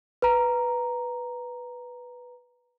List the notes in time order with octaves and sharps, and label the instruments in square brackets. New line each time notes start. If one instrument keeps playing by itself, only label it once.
[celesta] B4 A#5